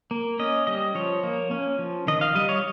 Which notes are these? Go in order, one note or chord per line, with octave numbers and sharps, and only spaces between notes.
A#3
C#4 D#5
G3 D#5
F3 C#5
A#3
C#4
F3
D#3 D#5
F5
G3 D#5
C#5